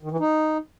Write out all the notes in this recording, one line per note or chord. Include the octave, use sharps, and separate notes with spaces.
D#3
E3
D#4